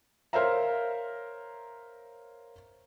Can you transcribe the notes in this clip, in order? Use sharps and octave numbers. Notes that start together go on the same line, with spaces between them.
A#4 C5 C#5 E5 F5 A#5